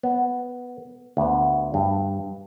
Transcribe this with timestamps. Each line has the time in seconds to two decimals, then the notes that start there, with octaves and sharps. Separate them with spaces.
0.03 B3
1.17 D2 B3
1.74 G2